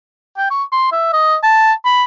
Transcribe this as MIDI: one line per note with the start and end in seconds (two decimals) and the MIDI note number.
0.38 0.48 79
0.50 0.63 85
0.72 0.88 84
0.92 1.09 76
1.13 1.36 75
1.43 1.72 81
1.85 2.04 83